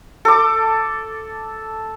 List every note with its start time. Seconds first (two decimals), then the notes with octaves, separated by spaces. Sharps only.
0.25 A4 D6